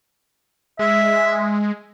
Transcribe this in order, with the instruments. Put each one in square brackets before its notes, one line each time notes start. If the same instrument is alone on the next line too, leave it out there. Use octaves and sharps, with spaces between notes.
[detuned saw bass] G#3 [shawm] E5